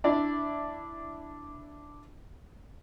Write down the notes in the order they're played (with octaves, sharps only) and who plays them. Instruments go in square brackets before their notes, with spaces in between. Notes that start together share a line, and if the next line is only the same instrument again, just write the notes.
[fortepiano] D4 E4 D5